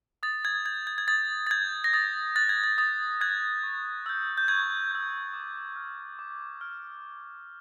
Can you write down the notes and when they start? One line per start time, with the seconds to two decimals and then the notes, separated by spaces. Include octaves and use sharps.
0.23 D#6 A6
0.45 G#6
0.66 G6 G#6
0.87 G#6
0.98 G#6
1.08 D#6 A6
1.47 A6
1.51 G6 G#6
1.84 A#6
1.93 D#6 A6
2.36 F#6 A6
2.49 G#6
2.64 A6
2.78 D#6 A6
3.21 F#6 G#6
3.63 C#6
4.06 E6 G6
4.38 G6
4.48 C#6 G#6
4.91 E6 G6
5.34 D6
5.76 F6
6.19 D6
6.61 F6